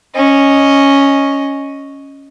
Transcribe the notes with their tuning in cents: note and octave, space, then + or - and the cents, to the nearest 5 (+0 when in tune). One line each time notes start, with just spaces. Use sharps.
C#4 +0 D#5 +0